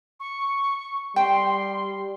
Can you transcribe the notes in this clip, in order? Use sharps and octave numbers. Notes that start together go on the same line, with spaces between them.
C#6
G3 G5 C6